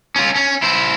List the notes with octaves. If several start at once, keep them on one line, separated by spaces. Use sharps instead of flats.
C#4 F4
C#4
E4 C5